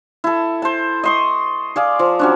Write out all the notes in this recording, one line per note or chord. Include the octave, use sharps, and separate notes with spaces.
E4 A4
C5 A5
D#5 C6 C#6
G#4 D5 F5
F3
F#3 C#4 D4